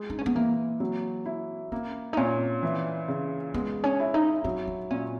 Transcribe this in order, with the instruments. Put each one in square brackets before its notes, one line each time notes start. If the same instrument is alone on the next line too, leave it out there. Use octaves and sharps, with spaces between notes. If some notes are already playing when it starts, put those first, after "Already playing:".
Already playing: [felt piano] G#3
[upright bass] D#4
C#4
B3
[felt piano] E3 [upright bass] A#3
[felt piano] F#3
E4
[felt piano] A#3 [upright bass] C#4
[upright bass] D#4
[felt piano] A#2 [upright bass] C#4
[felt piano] E3
C#3
[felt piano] G#3 [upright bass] B3
[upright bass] C#4
[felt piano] E4
[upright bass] D#4
[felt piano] F#3 [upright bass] D#4
[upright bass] D#4
[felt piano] A#2 [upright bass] C#4